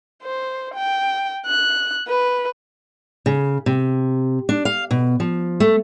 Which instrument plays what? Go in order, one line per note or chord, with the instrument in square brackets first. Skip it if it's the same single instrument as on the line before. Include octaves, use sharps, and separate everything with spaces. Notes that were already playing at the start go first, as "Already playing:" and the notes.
[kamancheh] C5
G5
F#6
B4
[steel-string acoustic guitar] C#3
C3
D4
F5
B2
F3
A3